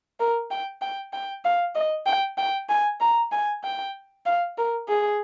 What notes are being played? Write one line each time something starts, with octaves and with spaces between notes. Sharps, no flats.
A#4
G5
G5
G5
F5
D#5
G5
G5
G#5
A#5
G#5
G5
F5
A#4
G#4